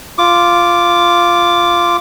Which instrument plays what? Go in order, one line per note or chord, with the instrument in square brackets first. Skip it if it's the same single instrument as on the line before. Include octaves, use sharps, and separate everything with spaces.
[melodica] F4 D6